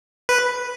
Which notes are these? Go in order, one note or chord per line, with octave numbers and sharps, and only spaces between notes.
B4